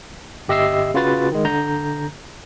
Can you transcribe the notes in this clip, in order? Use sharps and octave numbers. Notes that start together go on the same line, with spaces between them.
G1 G4 D#5 E5 E6 C7
C#3 F4 F#4 B4 A6
D#3 G#3
D3 A#5 G6